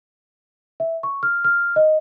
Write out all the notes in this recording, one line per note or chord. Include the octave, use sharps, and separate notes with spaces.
E5
C#6
F6
F6
D#5